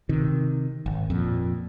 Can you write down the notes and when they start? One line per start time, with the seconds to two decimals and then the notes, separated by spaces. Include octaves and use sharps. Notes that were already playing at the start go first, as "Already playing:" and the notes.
0.09 C3 D#3
0.86 G#1
1.10 F2 A#2